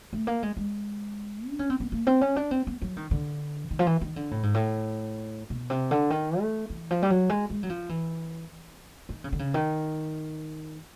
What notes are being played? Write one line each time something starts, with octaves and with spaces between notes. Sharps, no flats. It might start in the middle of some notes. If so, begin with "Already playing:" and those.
A3
A#3
G#3
G#3
D4
C#4
C4
B3
A#3
C4
C#4
D4
C4
B3
F#3
D#3
D3
D#3
F3
E3
D#3
D3
A2
G#2
A2
B2
C3
D3
D#3
A3
E3
F3
G3
F#3
G#3
G#3
F#3
F3
E3
D#3
C#3
D3
C#3
D#3